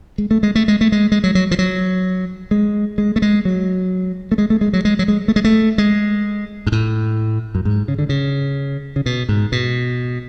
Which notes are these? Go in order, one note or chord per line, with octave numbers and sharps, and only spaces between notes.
G#3
A3
G#3
A3
G#3
A3
G#3
G#3
F#3
F#3
F3
F#3
G#3
G#3
A3
G#3
F#3
A3
G#3
A3
G#3
F#3
G#3
F#3
G#3
A3
G#3
A3
G#3
G#2
A2
F#2
G#2
C#3
D3
C#3
C#3
B2
G#2
B2